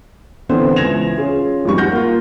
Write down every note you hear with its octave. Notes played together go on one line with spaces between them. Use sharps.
D3 E3 B3 C4 C5
C#2 E3 G#6 A#6 E7 F7
C#4 F4 G#4
G#1 F3 G3 C#6
F#5 F6 G6 A#6
A#3 F4